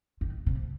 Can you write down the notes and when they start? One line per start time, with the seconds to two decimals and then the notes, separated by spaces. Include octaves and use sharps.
0.21 D#3
0.46 C3